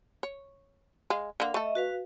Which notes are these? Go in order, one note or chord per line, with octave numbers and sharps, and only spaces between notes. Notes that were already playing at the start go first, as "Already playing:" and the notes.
C#5
G#3 F5
D3 A#3 F5
A3 A4 D#5 E5
F#4 B4 F5